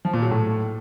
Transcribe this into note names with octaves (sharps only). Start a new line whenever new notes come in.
F3
A#2
F#3
A2